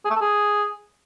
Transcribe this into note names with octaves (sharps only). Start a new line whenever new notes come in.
G#4
A3
A4
G#4